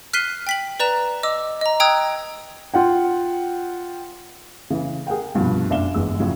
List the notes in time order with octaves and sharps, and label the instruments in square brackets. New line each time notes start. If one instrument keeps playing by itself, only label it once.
[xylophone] F6 F#6 B6 C7 D#7 G7
G5 B6 F#7
B4 D5 A#5 F#6 E7
D#5 D6 E6
D#5 A#5
G5 A#5 D#6 E6 F#6 G#6
[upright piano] F4 F#5 G5
C#3 E3
G#4 A#4 F#5 G5
C2 G2 B2 F3
F#1 D4 E5 F5 E7 G7
G1 E2 G#3 E6
F2 A2 C#3 F#3